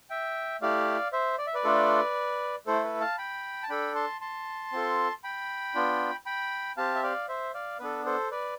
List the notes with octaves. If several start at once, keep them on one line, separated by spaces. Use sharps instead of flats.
E5 G5
A3 E4 G4 D5 F5
C5 E5
D5
E5
B4 D5
A3 D4 F4 A4
A3 E4 A4 C5
B4
F5 A5
G5 B5
A5
D4 A4 G5 B5
A5 C6
A5 C6
C4 F4 A4
G5 B5
B3 D4 F4
G5 B5
C4 G4 F5 A5
E5
D5 F5
C5 E5
D5 F5
B3 D4 A4 B4
A4 C5
B4 D5